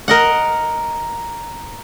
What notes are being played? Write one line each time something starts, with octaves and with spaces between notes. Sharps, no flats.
A#4 D#5 F#5